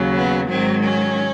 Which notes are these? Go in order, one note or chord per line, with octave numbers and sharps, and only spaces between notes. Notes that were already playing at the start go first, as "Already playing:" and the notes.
Already playing: D#2 C#3 F#3
B3
G#2 D#3 F#3 C4
C#4